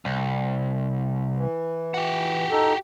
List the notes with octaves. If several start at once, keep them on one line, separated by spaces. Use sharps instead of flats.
C2
E3
F#4 G4
D#4 A4